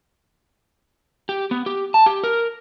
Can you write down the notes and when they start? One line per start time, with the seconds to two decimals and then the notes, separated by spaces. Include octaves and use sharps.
1.29 G4
1.51 B3
1.66 G4
1.94 A5
2.06 G4
2.24 A#4